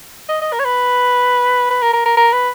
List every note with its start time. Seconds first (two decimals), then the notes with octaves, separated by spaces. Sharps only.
0.29 D#5
0.41 D#5
0.53 A#4
0.60 C#5
0.65 B4
1.70 B4
1.82 A#4
1.93 A#4
2.06 A#4
2.17 A#4
2.33 B4